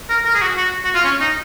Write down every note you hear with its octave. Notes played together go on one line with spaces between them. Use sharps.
A#4
A#4
G#4
F#4
F#4
F#4
F4
C#4
D#4